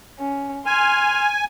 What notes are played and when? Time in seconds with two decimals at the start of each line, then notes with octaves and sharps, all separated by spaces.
0.19 C#4
0.66 G#5 C6 F6